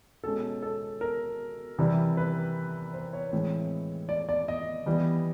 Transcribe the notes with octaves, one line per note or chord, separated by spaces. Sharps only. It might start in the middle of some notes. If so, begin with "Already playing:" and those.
B2 G#3 C#4 A4
A4
A#4
C3 E3 G3
B4
C5
C#5
A2 E3 G#3 C4
D5
D5
D#5
E3 G3 B3